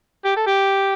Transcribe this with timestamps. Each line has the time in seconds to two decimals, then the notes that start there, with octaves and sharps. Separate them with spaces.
0.25 G4
0.36 A4
0.47 G4